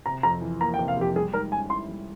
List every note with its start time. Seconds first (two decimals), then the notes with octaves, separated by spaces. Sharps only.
0.06 C3 A#5
0.23 F2 A#5
0.41 E3
0.61 A#3 A#5
0.74 G5
0.79 C3
0.88 F5
0.97 F2 G4
1.16 G3 G#4
1.33 G#2 A#4
1.52 C#4 G#5
1.70 E4 C6
1.89 G3